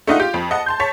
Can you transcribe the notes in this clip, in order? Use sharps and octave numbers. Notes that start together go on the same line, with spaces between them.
A3 D4 D#4 F4 D#5 F#5
F4 G4
F2
D#5 F#5 A5
A5 C6 G6
C#5 A5 B6